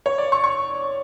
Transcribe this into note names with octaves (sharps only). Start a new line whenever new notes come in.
C#5
D5
C#6
C#6